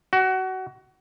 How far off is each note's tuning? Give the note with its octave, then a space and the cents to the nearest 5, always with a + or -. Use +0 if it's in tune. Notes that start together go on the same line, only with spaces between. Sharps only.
F#4 +25